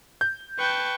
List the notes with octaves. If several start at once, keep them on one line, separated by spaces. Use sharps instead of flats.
G6
B4 G5 A5 C#6